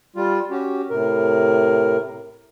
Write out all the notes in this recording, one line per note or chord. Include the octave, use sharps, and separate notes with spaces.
G3 F4
C#4 F#4 G4
A2 C3 A#4